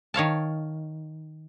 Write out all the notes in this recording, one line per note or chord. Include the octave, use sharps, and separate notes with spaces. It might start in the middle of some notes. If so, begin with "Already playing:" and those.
D#3 C#5 F5 A5